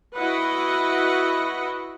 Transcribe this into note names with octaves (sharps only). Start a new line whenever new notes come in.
E4 F#4 B4 D#5 F#5